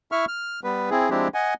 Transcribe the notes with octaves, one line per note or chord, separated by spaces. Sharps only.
E4 E5 C#6 F6
F6
G3 B3 B4
C4 E4 G#4
F3 G#3 C4 D4 E4 G4
D#5 F#5 G#5